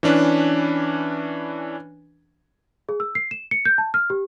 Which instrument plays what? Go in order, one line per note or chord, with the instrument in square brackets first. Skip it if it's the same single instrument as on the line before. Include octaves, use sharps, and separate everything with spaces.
[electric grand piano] E3 C#4 D4 B4
[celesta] G#4
E6
C7
E7
C#7
G6
A5
F6
G4